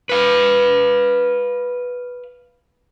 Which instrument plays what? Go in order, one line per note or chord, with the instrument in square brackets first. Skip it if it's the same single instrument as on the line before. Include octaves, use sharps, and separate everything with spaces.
[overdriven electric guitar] B4 F5